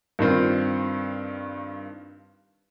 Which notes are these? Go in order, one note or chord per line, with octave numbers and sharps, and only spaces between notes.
G2 D#3 C4 F4